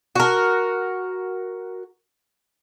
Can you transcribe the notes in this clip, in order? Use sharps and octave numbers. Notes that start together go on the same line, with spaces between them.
F#4 A#4